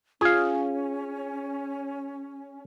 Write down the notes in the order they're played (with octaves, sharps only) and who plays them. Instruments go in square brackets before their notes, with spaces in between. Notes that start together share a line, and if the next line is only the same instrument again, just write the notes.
[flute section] C#4 [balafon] F4 [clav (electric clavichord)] G#4 F5